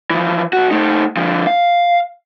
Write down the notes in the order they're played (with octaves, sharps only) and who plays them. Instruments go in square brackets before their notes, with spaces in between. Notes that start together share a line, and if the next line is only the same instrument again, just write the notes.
[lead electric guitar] E3 F3
B1 F#4
A3 D#4
D3 F3
F5